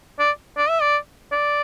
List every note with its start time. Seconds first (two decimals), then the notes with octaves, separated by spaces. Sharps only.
0.19 D5
0.57 D5
0.69 E5
0.82 D5
1.32 D5